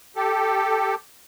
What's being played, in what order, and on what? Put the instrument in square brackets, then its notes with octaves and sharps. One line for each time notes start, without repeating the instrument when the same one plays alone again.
[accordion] G4 A4